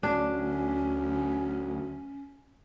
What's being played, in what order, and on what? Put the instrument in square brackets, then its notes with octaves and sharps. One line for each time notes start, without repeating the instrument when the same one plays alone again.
[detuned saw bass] D2 [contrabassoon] F#3 [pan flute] C#4 [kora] D4